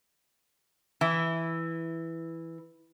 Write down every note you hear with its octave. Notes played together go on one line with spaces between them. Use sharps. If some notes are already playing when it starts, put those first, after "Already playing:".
E3 E4